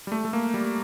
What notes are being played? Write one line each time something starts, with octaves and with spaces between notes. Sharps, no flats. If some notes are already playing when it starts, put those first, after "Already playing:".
G3
A3
A3
A#3
G3